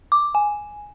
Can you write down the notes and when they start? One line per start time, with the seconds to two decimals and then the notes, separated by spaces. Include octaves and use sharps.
0.12 D6
0.35 G#5